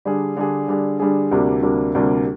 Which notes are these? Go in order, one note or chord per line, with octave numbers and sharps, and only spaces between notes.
D3 G3 D4 G#4
D3 G3 D4 G#4
D3 G3 D4 G#4
D3 G3 D4 G#4
D2 C3 G3 A#3 D4
D2 C3 G3 A#3 D4
D2 C3 G3 A#3 D4